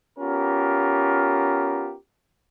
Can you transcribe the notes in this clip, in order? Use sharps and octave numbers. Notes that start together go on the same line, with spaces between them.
B3 C#4 F4 G4 A#4